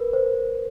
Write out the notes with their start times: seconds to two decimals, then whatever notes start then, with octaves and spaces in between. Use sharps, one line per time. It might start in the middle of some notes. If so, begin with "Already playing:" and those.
Already playing: A#4 B4
0.13 C5